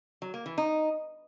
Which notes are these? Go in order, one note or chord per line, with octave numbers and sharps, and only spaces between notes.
F#3
A#3
E3
D#4